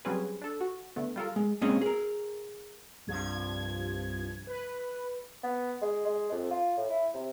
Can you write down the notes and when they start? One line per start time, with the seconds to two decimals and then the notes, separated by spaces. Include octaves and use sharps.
0.05 F#3 G3 C4 C#4 G#4 B4
0.41 D4 A4
0.61 F#4
0.96 D3 A3 B3
1.16 G3 F4 A4 A#4
1.36 G#3
1.61 G#3 A#3 C4 C#4 D#5
1.82 G#4 A#4
3.07 C2 G2 F3 G#6
4.47 B4
5.43 B3
5.81 G#3
6.06 G#3
6.31 F2
6.51 F4
6.77 A2
6.89 E4
7.14 C3